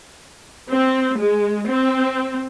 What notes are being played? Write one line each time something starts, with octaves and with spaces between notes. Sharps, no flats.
C4
G#3
C4